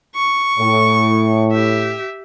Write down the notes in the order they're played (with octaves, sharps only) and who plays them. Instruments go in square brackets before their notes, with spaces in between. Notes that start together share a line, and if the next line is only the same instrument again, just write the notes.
[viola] C#6
[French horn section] A2
[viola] G4 E5